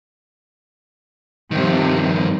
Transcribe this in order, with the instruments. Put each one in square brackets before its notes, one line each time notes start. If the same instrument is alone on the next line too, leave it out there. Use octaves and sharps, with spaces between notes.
[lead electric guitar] G2 D#3 [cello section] C3 F3